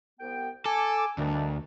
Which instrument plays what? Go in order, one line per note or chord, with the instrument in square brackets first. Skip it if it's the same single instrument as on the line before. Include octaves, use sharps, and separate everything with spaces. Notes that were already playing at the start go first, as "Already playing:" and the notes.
[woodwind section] C2 B3 G5
[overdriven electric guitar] A4 [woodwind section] G#5 D6
[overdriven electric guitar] D2 [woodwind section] D#3 G3 D4